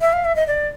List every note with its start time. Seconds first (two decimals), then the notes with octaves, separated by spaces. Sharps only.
0.01 E5
0.13 F5
0.25 E5
0.36 D#5
0.47 D5